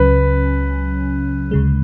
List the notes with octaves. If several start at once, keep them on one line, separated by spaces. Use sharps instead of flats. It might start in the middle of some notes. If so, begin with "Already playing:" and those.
Already playing: C#2 C#3 F#3 C#4 B4
D2 C#3 G#3